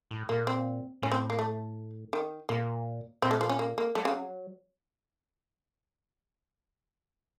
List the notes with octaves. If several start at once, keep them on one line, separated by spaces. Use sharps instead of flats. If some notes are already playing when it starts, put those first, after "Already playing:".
A2
A#2 A#3
C4
A2 C#4
C4
A#3
A3
D#3
A#2 A#3
A#2 C4
A3
F3
C#4
A#3
A#3
F#3 A3
C#3